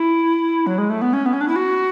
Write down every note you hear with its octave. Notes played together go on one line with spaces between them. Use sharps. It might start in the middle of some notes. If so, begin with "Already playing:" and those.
Already playing: E4
F#3
G#3
A3
B3
C#4
B3
C#4
D4
E4
F#4